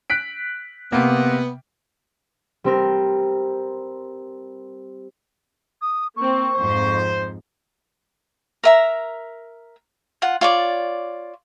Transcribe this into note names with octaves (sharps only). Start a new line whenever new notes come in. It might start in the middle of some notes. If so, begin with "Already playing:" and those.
F#6 B6 D7
C3 A#3 B3
G3 C4 A#4
D#6
A#3 C4 C#6
F2 G#2 C5
A#4 E5 A#5
F4 F#5
F4 C#5 D5